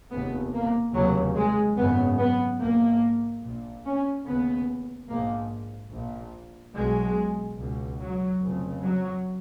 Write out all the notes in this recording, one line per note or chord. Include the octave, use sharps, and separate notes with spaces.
F1 D#2 C#3 B3
A#3
F1 D#2 C#3 F#3
G#3
G#1 F#2 C#3 B3
B3
A#1 G#2 A#3
A#1 A#2
C#4
F1 D#2 C#3 B3
A#1 G#2 A#3
A#1 A#2
B1 B2 G#3
C#2 B2
F#3
F1 F2 C#3
F#3